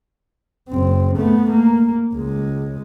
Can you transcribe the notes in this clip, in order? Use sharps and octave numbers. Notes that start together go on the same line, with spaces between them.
F#1 C4
A3 B3
A#3
C#2 G#3